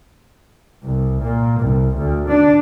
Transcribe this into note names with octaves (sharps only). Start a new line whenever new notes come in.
C2
A#2
C2
D2
D4